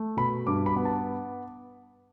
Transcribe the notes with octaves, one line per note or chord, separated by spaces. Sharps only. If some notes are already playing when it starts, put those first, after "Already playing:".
Already playing: A3
B2 B5
G2 D6
B5
B3
A5